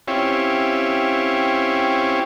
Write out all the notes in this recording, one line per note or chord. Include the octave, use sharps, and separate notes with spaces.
C4 C#4 E4 F4 G4 C#5